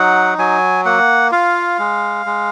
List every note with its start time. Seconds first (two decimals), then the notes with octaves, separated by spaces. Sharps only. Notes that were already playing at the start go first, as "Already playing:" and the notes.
Already playing: F#3 D#4 F#5
0.38 F#3 G#5
0.85 A#3 F#5
1.32 F4 F5
1.79 G#3
2.26 G#3